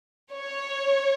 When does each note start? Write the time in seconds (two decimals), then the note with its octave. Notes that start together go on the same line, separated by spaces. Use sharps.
0.31 C#5